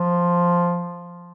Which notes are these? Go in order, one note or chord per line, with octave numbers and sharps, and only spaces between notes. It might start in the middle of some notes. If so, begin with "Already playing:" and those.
Already playing: F3